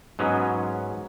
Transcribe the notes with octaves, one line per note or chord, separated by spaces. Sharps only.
G#2 F#3 B3 C#4